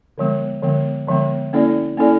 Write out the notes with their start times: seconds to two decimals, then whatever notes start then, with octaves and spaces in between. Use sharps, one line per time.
0.18 D3 F3 G#3 B3
0.63 D3 F3 G#3 B3
1.08 D3 F3 G#3 B3
1.53 A#3 C#4 E4 A4 D5
1.97 A#3 C#4 E4 A4 D5